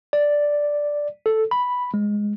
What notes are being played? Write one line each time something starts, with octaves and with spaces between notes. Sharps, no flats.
D5
A4
B5
G#3